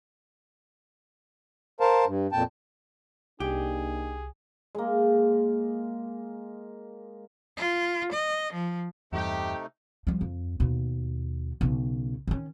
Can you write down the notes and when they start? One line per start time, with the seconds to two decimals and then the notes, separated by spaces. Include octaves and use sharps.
1.80 A#4 C5 F5 A5
2.06 G2
2.32 F2 A#2 G5 A5
3.40 C2 A#3 D4 D#4 G4 G#4
4.75 G#3 A#3
7.57 F4
8.13 D#5
8.54 F3
9.12 E2 G2 C3 A3 D#4 G4
10.07 F3 G3
10.21 F2
10.60 D#2 B2
11.61 B1 C#3
12.27 D#3 C#4